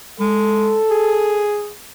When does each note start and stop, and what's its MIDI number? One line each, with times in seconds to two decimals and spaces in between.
0.20 0.78 56
0.20 1.46 69
0.90 1.72 68